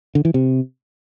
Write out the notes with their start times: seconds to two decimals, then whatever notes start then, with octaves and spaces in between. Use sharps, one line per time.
0.15 D3
0.25 E3
0.34 C3